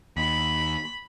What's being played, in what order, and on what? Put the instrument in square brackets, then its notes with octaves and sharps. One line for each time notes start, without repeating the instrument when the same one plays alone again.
[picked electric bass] D#2 [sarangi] B5